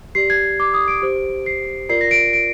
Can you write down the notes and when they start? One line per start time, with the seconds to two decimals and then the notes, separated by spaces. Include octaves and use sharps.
0.15 G4 D5 C7
0.30 G#6
0.60 D6
0.74 D#6
0.88 D7
1.02 G4 C5
1.46 C7
1.89 F4 A#4 D5 C7
2.01 A#6
2.11 D7
2.33 D7